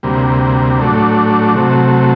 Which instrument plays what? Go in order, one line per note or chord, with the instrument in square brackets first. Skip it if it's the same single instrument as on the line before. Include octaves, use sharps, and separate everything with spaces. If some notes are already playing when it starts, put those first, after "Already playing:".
[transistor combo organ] D2 C3 G3 A#3
A2 F#3 A3 D4
C3 F#3 A3